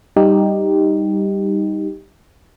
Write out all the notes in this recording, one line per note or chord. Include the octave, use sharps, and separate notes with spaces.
G3 D#4 G4